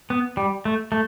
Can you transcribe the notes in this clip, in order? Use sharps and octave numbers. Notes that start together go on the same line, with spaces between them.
B3
G3
A3
A3